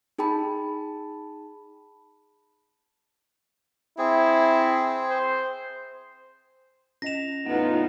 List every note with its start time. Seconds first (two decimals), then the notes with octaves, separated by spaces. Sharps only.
0.18 D#4 G#4 G5 A5 B5
3.98 C4 E4 G#4
5.10 C5
7.02 C#4 D#5 A#6 E7 F7
7.46 E2 A2 B3 D#4 F4 F#5